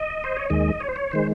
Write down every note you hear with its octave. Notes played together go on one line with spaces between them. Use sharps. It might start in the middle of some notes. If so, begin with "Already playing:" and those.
Already playing: D#5
C5
C#5
D#2 D#3 G#3 D#5
C#5
C5
C#5
D#3 G#3 C5